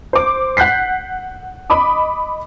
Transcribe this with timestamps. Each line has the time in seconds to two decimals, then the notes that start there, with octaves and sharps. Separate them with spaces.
0.13 C5 D6
0.57 F#5 F#6 G6 B6 C7
1.70 D#5 B5 D6 D#6